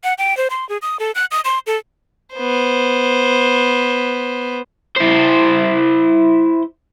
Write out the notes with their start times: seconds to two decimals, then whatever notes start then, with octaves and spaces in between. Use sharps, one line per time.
0.04 F#5
0.18 G5
0.37 C5
0.50 C6
0.69 G#4
0.82 D#6
1.00 A4
1.15 F#6
1.31 D#6
1.45 C6
1.67 A4
2.35 B3 C5
4.96 E4 C5